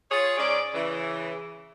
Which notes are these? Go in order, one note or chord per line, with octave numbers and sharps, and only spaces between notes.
F4 G#4 C#5
G#2 C#4 G#4 D5
C#3 E3